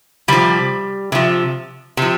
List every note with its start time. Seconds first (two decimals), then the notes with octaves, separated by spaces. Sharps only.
0.28 C3 F3 G3
1.12 C3 F3
1.97 C3 F3